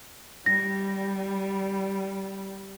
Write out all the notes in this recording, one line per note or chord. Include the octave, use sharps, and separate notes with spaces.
G3 A#6